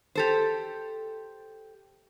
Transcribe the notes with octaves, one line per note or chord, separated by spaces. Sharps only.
G4 A4 C5